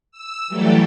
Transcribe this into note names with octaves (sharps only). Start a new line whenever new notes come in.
E6
E3 F#3 G3 A3 G4 A4